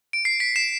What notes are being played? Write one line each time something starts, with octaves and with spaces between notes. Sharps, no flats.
D7
C7
B6 D7
C7 E7